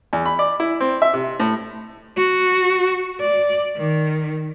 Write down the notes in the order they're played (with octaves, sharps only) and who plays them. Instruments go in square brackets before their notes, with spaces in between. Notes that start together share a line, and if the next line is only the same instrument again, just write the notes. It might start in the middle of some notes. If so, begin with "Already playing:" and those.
[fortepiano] E2
B5
D5
E4
C4
E5
C3
A2
[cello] F#4
D5
D#3